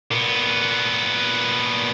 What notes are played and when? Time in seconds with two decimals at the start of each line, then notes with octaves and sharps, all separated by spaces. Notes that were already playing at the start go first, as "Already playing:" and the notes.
0.12 A#2 B3